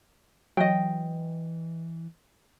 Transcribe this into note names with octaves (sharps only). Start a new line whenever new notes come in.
E3 F#3 D#5 G5